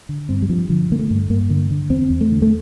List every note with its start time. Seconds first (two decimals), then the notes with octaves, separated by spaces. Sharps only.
0.09 D3
0.29 G2 C4
0.42 G3
0.49 G2 F3
0.69 D3 F3
0.90 D3 A#3
0.99 A3
1.10 G2
1.30 G2 A#3
1.50 D3
1.71 D3
1.90 E2 C4
2.10 E2
2.21 A3
2.31 D3
2.42 A3